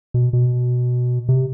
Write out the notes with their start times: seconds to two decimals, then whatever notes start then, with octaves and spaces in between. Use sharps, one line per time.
0.14 B2
0.33 B2
1.29 C3